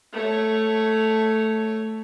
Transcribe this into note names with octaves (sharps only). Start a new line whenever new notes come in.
A3 C#5